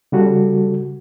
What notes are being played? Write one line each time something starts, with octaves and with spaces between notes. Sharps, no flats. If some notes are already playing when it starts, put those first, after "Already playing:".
C#3 G3 F#4 A4